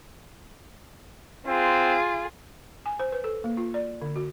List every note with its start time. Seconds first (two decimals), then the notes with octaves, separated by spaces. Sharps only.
1.46 C4 F4 G#4
2.86 G#5
3.00 C5
3.12 B4
3.24 A4
3.44 A#3
3.57 F4
3.74 D5
4.01 D3
4.16 F#4